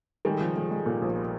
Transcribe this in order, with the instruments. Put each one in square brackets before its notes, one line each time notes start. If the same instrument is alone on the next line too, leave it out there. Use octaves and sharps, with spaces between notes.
[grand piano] D#3 G3 [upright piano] G#3
[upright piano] F3
G#3
G#3
A#2
A#1